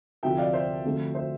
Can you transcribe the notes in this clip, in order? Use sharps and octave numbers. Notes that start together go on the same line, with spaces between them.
D2 C3 F3 E5 G5
D5 F5
C5 E5
F2 D3 F3 A3
C5 E5